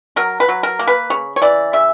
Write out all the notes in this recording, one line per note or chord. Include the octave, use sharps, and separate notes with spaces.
F#3 A#4
B4
F#3
A#4
A#3
B4
C#3 C#5
C#5
E3 D5
C#3 E5